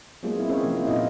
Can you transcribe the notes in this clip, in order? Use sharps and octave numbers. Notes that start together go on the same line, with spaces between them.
F#3 G#3 A#3 B3 F4 G#4
C4 E4
C4 C#4 G#4 A#4 C5 C#5
C3 F3 A#3
A#3 C4 E4 F4
A#2 B3 C4 D#4 F4 D#5